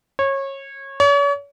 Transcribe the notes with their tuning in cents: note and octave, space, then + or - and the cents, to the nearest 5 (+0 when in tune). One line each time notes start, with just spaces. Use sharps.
C#5 -25
C#5 +40